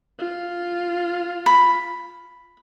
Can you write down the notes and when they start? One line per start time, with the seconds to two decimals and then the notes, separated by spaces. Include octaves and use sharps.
0.19 F4
1.46 B5